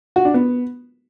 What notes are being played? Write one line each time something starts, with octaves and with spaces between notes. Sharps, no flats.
F#4
D4
B3